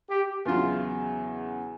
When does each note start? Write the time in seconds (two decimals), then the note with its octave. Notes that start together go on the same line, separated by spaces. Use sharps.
0.09 G4
0.45 E2 C#3 F#3 F4